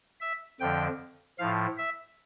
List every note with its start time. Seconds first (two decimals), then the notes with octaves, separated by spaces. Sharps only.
0.21 E5
0.60 F2 D3 F3 G5
1.38 A2 F3 F5
1.78 E5